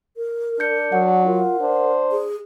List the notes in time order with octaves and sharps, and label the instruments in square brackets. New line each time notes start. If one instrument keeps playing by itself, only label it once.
[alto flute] A#4
[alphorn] D4 [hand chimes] G6 C#7
[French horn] F#3 [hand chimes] F#5
[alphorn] F4 [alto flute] A#4
[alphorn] D4 [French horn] C5
[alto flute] G#4